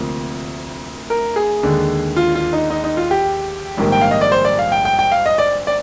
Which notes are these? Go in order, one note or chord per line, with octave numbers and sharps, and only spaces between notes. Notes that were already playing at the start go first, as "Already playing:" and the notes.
Already playing: D2 C3 F3 A#3
A#4
G#4
D#2 D3 G#3
F4
F4
D#4
D#4
D#4
F4
G4
A#1 G#2 D#3 G3 A#3
G5
F5
D#5
D5
C5
D5
F5
G5
G5
G5
F5
D#5
D5
D5